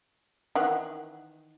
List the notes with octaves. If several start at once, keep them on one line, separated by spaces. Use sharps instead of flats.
D#3 E3 F#5